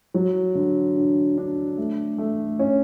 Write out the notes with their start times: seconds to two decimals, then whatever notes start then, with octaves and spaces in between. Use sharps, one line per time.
0.14 F#3
0.55 D3
0.96 D4
1.38 D4
1.77 A3
2.18 A3
2.59 C#4